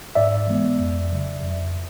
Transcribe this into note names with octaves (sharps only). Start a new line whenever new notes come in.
G#2 D5 E5
E3 G#3 B3
F2
C#3 F#3
F2